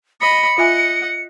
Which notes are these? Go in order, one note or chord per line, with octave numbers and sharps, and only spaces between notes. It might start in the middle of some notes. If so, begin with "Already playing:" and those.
D#5 B5 C#7
F4 D#5 E5 F#5 G#5